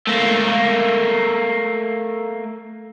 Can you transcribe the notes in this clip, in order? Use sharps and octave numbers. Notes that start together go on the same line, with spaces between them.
A3 A#3